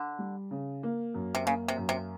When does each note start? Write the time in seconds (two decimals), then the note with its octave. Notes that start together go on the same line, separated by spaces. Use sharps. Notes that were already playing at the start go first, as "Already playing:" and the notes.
Already playing: D3
0.19 G3
0.51 C#3
0.83 A#3
1.14 F#2
1.35 C3
1.46 C#3 A#3
1.68 C3
1.78 F#2
1.89 C3